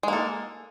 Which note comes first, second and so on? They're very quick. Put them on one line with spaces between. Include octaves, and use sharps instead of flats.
G#3 A#3 A4